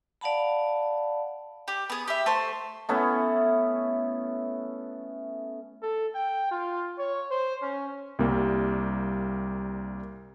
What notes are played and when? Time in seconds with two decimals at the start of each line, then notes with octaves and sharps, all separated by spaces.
0.21 D5 F5 F#5 A5 B5
1.68 G4
1.90 B3 G#4
2.08 G4 E5
2.26 A3 C5
2.89 A3 B3 C#4 E4
5.82 A4
6.15 G5
6.51 F4
6.98 C#5
7.31 C5
7.62 C#4
8.19 C2 G3 A#3